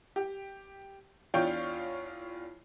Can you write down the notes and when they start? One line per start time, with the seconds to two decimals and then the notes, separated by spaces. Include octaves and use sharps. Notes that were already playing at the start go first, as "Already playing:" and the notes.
0.16 G4
1.34 E2 D4 F4 C#5 G5 G6